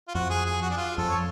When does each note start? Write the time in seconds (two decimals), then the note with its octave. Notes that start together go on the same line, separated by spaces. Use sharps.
0.08 F4
0.15 F2 F#4
0.30 G#4
0.46 G#4
0.62 F#4
0.71 D4
0.77 F4
0.98 F2 A4
1.09 C#5